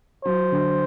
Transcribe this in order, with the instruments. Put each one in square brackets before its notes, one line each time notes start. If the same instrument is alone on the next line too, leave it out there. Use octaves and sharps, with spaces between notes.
[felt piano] F#3 [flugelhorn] C5
[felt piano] D3